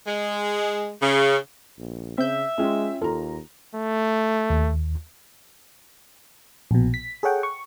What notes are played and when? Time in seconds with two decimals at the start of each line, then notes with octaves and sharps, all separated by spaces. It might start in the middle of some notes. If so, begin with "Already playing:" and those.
0.06 G#3
1.01 C#3
1.78 A#1
2.18 C#3 C4 E5 G6
2.58 G#3 C#4 F4 G5
3.02 D#2 F4 A4 A#5
3.75 A3
4.50 D#2
6.71 A#1 B2
6.94 B6
7.23 G#4 A4 C#5 F#5 G5
7.43 C#6